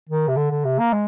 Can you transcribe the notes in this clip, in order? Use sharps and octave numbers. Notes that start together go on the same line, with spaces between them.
D#3
C3
D3
D3
C3
A#3
G#3